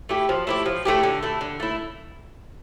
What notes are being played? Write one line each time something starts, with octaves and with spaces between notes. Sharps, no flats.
A3 E4 G4
F3
A3 E4 G4
F3
A3 E4 G4
D3
A3 E4
D3
A3 E4